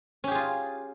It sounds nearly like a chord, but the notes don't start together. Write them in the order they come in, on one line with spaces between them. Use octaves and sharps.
C#4 G4 G#4 F4